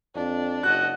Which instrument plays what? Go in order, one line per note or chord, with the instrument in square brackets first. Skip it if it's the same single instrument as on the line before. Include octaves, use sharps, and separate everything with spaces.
[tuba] F2 [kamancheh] D4
[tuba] F#1 [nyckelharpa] F#4 D#5 [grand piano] F#6